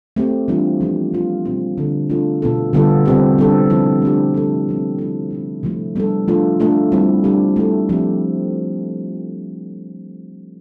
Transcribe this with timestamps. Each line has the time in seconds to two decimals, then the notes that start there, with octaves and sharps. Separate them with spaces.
0.16 A3 C4 G4
0.48 E3 G3 D4 F4
0.80 F3 B3 D4 G4
1.13 E3 G3 B3 F4
1.45 B2 G3 C4 F4
1.78 D3 G3 D4 F4 A4
2.09 A3 D4 F4 A4
2.42 B2 B3 F4 A4
2.73 D3 G3 B3 F4 A4
3.06 C3 G3 C4 G4
3.38 G3 B3 D4 A4
3.70 F3 C4 E4
4.02 A3 D4 G4
4.34 A3 D4 A4
4.67 D3 F3 C4
4.98 A3 E4 A4
5.31 A3 C4 E4
5.63 C3 F3 A3 E4
5.96 G3 B3 D4 A4
6.28 F3 A3 D4 F4 A4
6.60 A3 D4 F4 A4
6.92 G3 C4 E4
7.24 G3 D4 G4
7.56 A3 E4 A4
7.89 F3 C4 G4